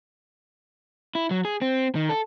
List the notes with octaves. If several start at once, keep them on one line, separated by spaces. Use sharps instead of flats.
E4
F#3
G#4
C4
D#3
A4